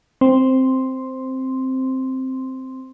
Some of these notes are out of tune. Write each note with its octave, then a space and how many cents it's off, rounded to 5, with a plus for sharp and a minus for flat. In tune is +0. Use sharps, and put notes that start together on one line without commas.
C4 +0 C6 +0